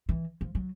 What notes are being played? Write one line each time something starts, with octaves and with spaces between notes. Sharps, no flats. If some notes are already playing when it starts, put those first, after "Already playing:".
E3
F3
F#3